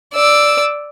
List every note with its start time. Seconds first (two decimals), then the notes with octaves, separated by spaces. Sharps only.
0.14 D5 E6